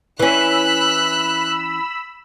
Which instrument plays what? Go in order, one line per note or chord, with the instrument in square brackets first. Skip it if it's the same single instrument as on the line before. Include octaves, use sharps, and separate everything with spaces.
[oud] E3 C#4 [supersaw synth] B5 E6 [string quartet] F#6